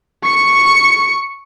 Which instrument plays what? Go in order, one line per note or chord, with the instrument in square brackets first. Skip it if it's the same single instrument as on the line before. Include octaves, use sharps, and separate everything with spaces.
[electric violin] C#6 C#7